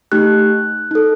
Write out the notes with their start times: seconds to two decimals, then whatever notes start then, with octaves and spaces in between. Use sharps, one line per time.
0.12 A3 D#4 G4 F#6
0.91 D#4 A4